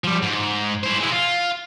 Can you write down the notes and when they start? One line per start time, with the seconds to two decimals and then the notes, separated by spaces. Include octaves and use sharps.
0.04 F3 G3
0.22 G#2
0.83 E4 C5
1.00 G#3 E4
1.12 F4